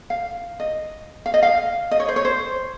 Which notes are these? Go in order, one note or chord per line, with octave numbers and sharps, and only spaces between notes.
F5
D#5
F5
D#5
F5
D#5
C#5
C5
C#5
C5